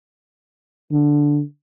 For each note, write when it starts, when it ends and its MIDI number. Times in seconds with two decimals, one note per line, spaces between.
0.92 1.40 50